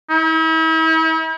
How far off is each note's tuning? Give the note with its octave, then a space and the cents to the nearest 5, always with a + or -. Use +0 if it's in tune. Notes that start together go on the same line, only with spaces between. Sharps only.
E4 -45